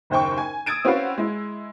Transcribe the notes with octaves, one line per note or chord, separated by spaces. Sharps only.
F#1 D#2 C5 G5 C#6
G#5
D#6 E6 G#6 A6 D7 D#7
C4 C#4 E4 F#4 B4 F5
G#3 E4